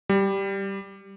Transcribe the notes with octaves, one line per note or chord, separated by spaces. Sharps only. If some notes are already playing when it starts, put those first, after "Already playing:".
G3